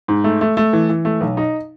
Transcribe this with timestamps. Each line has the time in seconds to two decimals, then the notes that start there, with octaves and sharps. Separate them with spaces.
0.08 G#2
0.24 A3
0.41 A3
0.57 A3
0.73 E3
0.90 E3
1.05 A3
1.21 B1
1.37 D#4